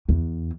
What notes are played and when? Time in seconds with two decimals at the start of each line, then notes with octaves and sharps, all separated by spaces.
0.09 E2